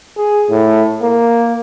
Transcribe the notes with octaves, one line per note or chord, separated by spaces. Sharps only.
G#4
A2
A#3